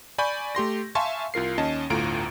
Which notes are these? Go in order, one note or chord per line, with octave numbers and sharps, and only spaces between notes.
D5 G#5 B5 C#6 G6
A3 G4 C6 A#6
E5 F5 G#5 A5 C6 C#6
C2 F4 A#4 C7
D#2 C#4 D#5 A5
G1 D2 A2 F4 A#5 D7